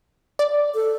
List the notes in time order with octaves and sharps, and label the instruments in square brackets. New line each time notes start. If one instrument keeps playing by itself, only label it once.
[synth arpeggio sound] D5
[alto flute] A4